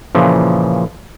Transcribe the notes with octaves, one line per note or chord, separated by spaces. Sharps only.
A#2 C#3 E3 F3